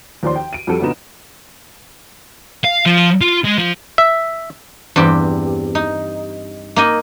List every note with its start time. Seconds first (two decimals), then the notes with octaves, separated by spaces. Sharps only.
0.23 D#2 F3 D5 C6
0.36 G5
0.53 D7 D#7
0.67 F2 G3 F#4 A4
0.80 F#2 A#2 D3 B3 D#4 E7
2.65 F5
2.86 F3
3.21 F4
3.44 G#3
3.58 F3
3.98 E5
4.96 E2 G2 C4 G4
5.75 D#4
6.76 A#3 D#4 D#5